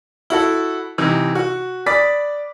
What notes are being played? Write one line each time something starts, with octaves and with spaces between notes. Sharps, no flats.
E4 F#4 A4
C3 E3 D#4
F#4
D5 B5 D6 D#6 A6 B6